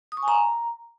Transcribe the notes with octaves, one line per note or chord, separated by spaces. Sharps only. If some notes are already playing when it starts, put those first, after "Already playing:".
D#6
C#6
G#5
A#5